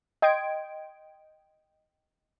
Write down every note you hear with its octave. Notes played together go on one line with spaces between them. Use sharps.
D#5 G5 C6 G#6 D7